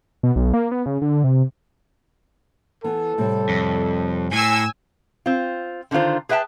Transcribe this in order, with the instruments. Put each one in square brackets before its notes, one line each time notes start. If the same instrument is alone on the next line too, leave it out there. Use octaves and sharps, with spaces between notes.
[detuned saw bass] B2
B1
A#3
B3
C#3
D3
C3
[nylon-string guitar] E3 B3 [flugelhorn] A4
[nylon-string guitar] A2 C3 G3
[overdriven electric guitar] F2
[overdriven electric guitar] A2 [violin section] G#5 E6
[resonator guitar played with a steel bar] C4 F4
D3 D#3 D4 F4 C5
G#4 B4 E5 G5 A5